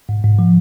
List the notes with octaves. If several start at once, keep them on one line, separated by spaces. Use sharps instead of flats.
G#2
G#2
F3